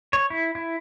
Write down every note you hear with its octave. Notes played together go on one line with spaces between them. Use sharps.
C#5
E4
E4